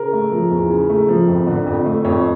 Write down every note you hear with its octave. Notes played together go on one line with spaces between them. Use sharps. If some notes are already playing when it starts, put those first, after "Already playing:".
Already playing: C#3 A#4
A3
F3
E2
C#3
A3
F3
F2
D3
F2
A3
F2 C#5